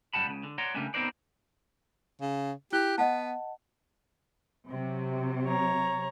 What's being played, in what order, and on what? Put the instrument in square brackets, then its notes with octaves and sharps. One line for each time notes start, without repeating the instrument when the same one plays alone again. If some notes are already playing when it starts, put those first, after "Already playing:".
[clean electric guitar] F#2 F#3 G3 F#5 A5 B5
C#2 C#3
D3
C#5 D5 F#5 A#5 C6
C#3 G3 A3 A#3 C#4 D4
B3 C4 D#4 A#4 C5 D5
[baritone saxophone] C#3
[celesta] E4 F#6 G7 [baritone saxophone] G4
[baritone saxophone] B3 [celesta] D#5 F#5 A5
[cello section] C3 F#3
[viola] C#5 A#5